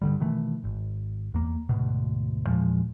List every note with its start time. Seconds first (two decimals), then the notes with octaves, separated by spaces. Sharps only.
0.02 G2 D3 G3
0.20 B2 D#3 E3 A3
0.64 G#1
1.34 E2 A#3
1.69 D2 G#2 B2
2.46 E2 A#2 F3 G#3